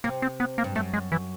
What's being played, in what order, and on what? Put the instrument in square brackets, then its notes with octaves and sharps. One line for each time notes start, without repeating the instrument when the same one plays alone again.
[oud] C3 [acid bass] A#3
[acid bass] C4
B3
A#3
[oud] G2
[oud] F#2 [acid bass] A3
[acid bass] G#3
E3